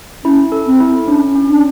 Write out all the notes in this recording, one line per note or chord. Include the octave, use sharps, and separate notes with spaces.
C#4 E4
A4
C4
E4
C#4 D4
C#4
D4